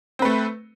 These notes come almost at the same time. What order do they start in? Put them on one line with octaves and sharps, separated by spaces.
C4 B4 A3